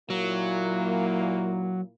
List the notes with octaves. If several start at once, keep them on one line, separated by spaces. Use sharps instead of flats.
A#2 F#3 A#3 E4